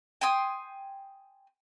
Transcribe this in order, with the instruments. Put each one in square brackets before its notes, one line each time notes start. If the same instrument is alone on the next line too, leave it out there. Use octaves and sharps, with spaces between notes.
[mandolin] G5 G#5 C6 D#6